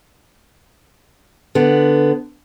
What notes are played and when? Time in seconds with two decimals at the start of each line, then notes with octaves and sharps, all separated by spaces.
1.55 D3 B3